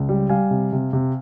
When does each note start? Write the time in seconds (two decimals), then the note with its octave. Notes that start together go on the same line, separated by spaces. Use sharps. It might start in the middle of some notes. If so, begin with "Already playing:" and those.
Already playing: C#2
0.09 G3
0.29 G3 F5 G#5
0.51 C3
0.72 C3
0.93 C3